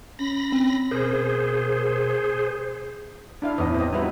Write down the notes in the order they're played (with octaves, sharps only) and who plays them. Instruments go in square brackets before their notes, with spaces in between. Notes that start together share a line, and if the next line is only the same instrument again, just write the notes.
[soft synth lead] C#4 [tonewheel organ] B5 A#6
[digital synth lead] C4
[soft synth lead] B2 [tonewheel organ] G#4 C5 [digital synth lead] A#4
[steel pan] D4 E4 F5
[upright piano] E2 A2 [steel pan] D#5
[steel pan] C4 D#5
[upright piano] G3 F#4 [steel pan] D#4 E4 B4